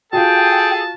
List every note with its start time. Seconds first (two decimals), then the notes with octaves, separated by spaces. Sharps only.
0.13 F4 F#4 G#4 A4 G5 A5